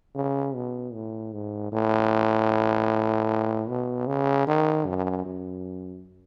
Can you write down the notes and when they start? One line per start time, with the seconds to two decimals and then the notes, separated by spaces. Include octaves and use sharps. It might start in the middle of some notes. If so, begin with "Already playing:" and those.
0.15 C#3
0.55 B2
0.93 A2
1.33 G#2
1.72 A2
3.69 B2
4.07 C#3
4.47 D#3
4.86 F#2
5.25 F#2